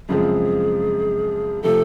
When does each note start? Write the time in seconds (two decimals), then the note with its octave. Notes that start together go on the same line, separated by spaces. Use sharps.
0.09 F#2 C#3 F3 G#3 C4 G#4
1.62 C3 F3 A3 A4